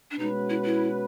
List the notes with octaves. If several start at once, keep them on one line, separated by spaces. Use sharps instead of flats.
D4
B2 G#3 C#4 D#4 F#4 B4
E4
E4